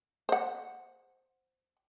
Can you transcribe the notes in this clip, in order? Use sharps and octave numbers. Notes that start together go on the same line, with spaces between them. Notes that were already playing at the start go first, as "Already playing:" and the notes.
C5 F#5